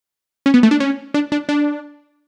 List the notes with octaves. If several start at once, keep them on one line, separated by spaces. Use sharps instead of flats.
C#4
B3
A3
D4
C#4
D4
D4
D4